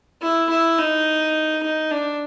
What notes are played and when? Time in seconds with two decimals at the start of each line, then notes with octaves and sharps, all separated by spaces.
0.21 E4
0.50 E4
0.78 D#4
1.63 D#4
1.91 D4